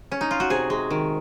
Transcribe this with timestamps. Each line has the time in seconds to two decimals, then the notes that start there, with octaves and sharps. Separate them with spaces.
0.12 C#4
0.21 D#4
0.31 F4
0.40 F#4
0.50 C3 G#4
0.70 G#3
0.91 D#3